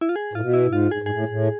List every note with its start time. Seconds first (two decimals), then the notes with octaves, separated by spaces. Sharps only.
0.01 E4
0.09 F4
0.16 G#4
0.33 A2 F4
0.40 B2
0.54 E4
0.67 G#2
0.73 F4
0.91 G#2 G#4
1.02 G#2
1.06 A2 G#4
1.29 A2